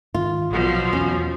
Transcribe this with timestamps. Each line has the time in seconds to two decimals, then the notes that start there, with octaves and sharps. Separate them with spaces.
0.14 G#2 D#3 G#3 F4
0.50 A#1 B2 F3 F#3
0.93 E2 C#4